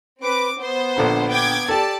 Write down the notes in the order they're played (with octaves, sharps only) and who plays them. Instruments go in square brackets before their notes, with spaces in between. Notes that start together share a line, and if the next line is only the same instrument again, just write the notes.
[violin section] C4 D6 [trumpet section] B4
[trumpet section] B3 [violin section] C5
[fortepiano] A#1 D3 B5
[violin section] G5 D6 G#6
[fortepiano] G4 A4 [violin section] D5 A5